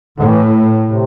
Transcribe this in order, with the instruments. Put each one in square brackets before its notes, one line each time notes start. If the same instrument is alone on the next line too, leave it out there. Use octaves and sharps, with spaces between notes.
[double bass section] A2 [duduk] D3
[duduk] E3
C3